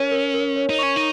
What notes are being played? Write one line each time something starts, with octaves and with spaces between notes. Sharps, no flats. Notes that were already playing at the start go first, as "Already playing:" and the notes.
Already playing: C#4 A#4 C#5
A#4
A#4
C#5
D#4
C#4 C#6
D#4